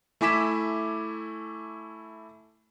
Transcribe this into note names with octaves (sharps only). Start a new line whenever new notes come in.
A3 E4 G#5 D6 B6 E7